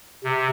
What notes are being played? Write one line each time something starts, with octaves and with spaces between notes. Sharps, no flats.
C3